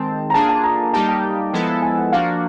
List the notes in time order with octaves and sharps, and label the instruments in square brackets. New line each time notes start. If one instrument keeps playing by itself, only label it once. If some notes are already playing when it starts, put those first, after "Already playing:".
Already playing: [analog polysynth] D#3 G#3 C4 [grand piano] A5
[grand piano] A#5
[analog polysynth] A#3 D4 F4 G#4 [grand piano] A5
[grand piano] A5
A#5
[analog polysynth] G3 A#3 D#4 G4 [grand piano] A5
[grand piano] A5
[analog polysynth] F3 G#3 B3 E4 A4
[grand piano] G#5
F#5
[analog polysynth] F3 A#3 D4 F#4 [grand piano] F5